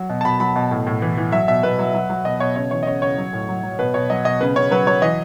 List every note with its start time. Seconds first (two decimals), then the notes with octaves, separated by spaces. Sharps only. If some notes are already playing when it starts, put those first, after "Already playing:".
Already playing: F#3
0.10 B2
0.21 A5
0.25 B2 B5
0.40 F#3 B5
0.56 B2
0.71 A2
0.87 A2
1.02 E3
1.18 E3
1.32 F#3 E5
1.48 B2 E5
1.63 B2 B4
1.79 F#3
1.94 F#3
2.10 F#3
2.25 B2 D#5
2.40 B2 C#5
2.56 C#3 C#5
2.71 E3 C#5
2.83 D#5
2.87 C#3 C#5
3.02 C#3 C#5
3.18 F#3
3.33 A2
3.49 F#3
3.63 F#3
3.79 B2 B4
3.94 B2 C#5
4.10 F#3 D#5
4.25 B2 D#5
4.41 C#3 B4
4.56 C#3 C#5
4.71 F#3 B4
4.87 F#3 C#5
5.02 E3 D#5